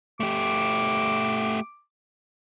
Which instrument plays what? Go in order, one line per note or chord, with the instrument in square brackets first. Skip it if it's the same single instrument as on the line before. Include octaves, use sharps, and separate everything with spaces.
[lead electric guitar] A3 G4 [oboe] D6